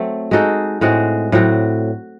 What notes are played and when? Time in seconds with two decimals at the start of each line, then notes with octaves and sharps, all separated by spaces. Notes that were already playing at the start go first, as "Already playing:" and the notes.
Already playing: F#3 A3 C4
0.31 G#3 D#4 F#4 A4
0.81 A2 G#3 C4 F#4
1.32 A2 F#3 C4 F#4